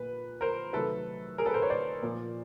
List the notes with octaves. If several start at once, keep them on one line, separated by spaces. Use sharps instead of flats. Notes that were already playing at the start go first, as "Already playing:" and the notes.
Already playing: A#2 A#3 B4
A#4 C5
C3 D#3 F#3 A3 A4 B4
G#4 A#4
A4 B4
A#4 C5
B4 C#5
C5 D5
A#2 F3 A#3